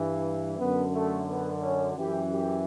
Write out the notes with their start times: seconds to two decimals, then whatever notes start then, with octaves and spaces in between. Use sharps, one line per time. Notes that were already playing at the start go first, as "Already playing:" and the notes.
Already playing: G2 E3
0.58 F#2 D3 B3
0.93 A3
1.27 B3
1.62 C#4
1.96 F#2 E3 G4
2.31 G4